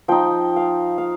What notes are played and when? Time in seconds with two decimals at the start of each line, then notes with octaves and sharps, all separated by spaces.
0.08 F3 D#4 G5
0.56 F5
0.98 F5